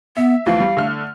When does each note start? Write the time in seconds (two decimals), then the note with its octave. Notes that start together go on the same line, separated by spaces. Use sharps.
0.17 B3 E5
0.46 D2 E3 F3 F5
0.60 G3
0.77 D3 A3 F6